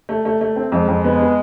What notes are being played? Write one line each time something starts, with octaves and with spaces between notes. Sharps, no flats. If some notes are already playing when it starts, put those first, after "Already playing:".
A3
A3
A3
C4
F2 G#3
F2
B3
B3